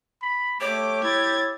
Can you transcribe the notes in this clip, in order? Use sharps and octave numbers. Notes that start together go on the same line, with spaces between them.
B5
A3 G4 C#5 D6
E4 G#6 A6